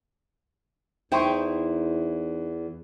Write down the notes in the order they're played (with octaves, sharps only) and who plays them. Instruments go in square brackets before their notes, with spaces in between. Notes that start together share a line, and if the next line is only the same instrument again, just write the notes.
[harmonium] E2 [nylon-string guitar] D#4 E4 C5 [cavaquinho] G5 C6 C#6